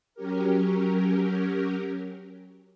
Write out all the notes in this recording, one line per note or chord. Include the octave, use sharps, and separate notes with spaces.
F#3 C#4 G4 A#4